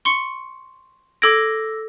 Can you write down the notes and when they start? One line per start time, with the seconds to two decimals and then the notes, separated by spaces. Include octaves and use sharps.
0.05 C6 C#6 C#7
1.22 A4 D6 E6 G#6 A#6 D7